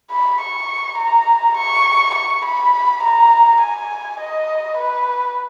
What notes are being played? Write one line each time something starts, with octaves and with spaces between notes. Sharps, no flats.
B5
C#6
A#5
C#6
C#6
B5
A#5
G#5
D#5
B4